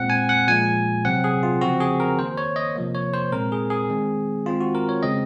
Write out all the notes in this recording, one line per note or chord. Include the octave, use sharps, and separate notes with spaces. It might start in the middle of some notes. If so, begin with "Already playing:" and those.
Already playing: A#2 G#3 C4 F#5
G#5
F#5
A#2 F3 G#3 G#5
C3 F#3 C4 F#5
G#4
F4
C#3 F3 C4 F#4
G#4
A#4
D#3 A#3 C5
C#5
D#5
C3 F3 A#3
C#5
C5
A#2 G#3 C4 A#4
G#4
G#4
D#3 G#3 C4
D#3 G#3 C4 F4
F#4
A#4
C#5
C#3 G#3 C4 D#5